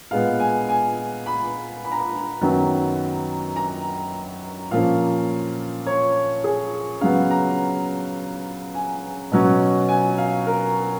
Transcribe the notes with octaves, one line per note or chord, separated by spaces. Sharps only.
A#2 G#3 B3 F5
G#5
G#5
B5
B5
A#5
B5
F#2 D#3 F#3 B3
A#5
A#2 F3 A#3 C#4 F5
C#5
G#4
C#3 F#3 B3 F5
A#5
G#5
B2 F#3 C#4
G#5
F5
A#4